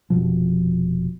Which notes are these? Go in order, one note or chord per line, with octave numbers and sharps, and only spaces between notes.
F1 B2 F3